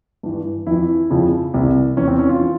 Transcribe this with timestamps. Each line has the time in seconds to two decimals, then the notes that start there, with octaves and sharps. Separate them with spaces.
0.23 G2 E3
0.67 F2 E3 E4
1.10 F2 C#3 F3
1.54 C2 C3 E3
1.97 E2 E3 C#4
2.08 C4
2.19 C#4
2.29 F4
2.41 E3